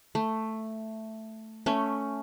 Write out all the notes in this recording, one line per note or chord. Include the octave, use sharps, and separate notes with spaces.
A3
A3 C#4